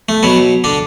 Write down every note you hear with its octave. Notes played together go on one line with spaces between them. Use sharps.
A3
B2 F#3 B3
D3 D4